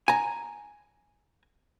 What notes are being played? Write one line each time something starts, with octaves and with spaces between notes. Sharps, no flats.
G#5 A#5